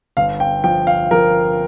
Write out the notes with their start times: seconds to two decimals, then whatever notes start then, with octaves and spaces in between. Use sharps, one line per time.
0.17 G1 F5
0.40 G5
0.64 F3 G5
0.87 F5
1.11 F3 A#4